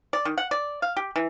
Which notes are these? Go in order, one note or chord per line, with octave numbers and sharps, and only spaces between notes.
D5
D#3
F#5
D5
F5
G4
E3